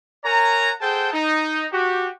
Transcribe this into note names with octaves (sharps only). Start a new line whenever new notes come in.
A#4 C#5 F#5 G#5 A#5
G#4 A4 C5 F#5 G5 A5
D#4
F#4 G4